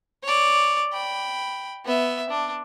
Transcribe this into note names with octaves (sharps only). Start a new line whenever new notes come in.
C#5 D5
G5 B5
B3 E5
D4